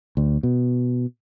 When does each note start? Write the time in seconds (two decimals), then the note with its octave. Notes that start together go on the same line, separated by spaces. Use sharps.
0.17 D2
0.43 B2